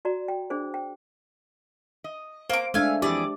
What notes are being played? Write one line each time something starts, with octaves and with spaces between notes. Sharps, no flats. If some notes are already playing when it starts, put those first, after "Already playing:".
F#4 D5 A#5
G5
D4 G#4 C5
G5
D#5
A#3 C5 D6
G#3 A3 D4 E5 F5 G#5
F2 E3 G4 G#4 D5